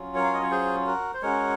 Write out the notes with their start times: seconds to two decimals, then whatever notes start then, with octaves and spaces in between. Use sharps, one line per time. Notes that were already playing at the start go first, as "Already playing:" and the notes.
Already playing: F#3 C#4 F4
0.15 A#4 C#5
0.24 F5
0.34 D#5
0.43 C#5
0.51 G#4 C5
0.86 F#4 A#4
1.14 C5
1.22 G#3 C#4 F#4 A#4 C#5